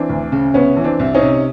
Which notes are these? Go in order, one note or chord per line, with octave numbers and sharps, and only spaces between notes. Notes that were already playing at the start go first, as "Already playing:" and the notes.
Already playing: E3 C4 D4
D2
C#3
C2 B3 C#4
E3
C4 D4
C2
C#4 D#4
C3